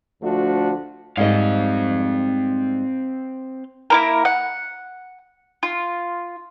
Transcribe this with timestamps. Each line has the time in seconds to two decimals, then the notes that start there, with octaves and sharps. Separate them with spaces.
0.22 D2 F3 A3 D4 F#4
1.17 G#2 G3 C4 D#5 F5
3.90 A#3 E4 A#4
4.25 F#5
5.63 F4